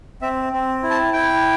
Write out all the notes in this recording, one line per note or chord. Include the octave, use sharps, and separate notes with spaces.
C4 E5
C4
E4
A5
E4 G5